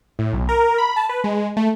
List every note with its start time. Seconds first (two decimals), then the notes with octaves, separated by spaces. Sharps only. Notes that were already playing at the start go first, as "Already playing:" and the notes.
0.19 A2
0.33 B1
0.49 A#4
0.78 B5
0.96 A5
1.09 B4
1.24 G#3
1.57 A3